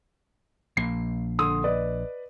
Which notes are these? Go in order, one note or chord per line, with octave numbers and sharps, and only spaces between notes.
A#1 A#3 C7
D3 C6 D#6
B4 D5 D#5